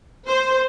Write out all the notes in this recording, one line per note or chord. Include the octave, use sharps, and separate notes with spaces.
C5